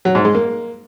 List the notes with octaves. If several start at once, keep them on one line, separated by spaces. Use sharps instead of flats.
F#3
G#2
G#3
A#3